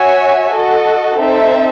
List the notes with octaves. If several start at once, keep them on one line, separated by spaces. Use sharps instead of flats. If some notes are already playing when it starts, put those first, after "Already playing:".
Already playing: F#4 C#5 E5 G#5
F#4 A4 D#5
C4 D#4 A4 C5 E5